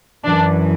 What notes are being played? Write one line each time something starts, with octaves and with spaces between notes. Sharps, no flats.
F#2 E3 D4